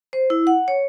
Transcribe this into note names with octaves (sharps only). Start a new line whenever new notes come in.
C5
E4
F#5
C#5